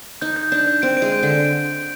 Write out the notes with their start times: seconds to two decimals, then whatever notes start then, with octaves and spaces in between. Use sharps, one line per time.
0.21 D#4 G6
0.36 G6
0.52 D4 G6
0.68 G6
0.82 C4 D7
0.97 G#3 D7
1.12 G6
1.23 D3 D7